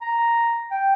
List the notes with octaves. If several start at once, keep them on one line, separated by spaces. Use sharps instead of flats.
A#5
G5